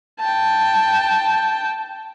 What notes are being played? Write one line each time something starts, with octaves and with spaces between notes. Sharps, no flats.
G5 A5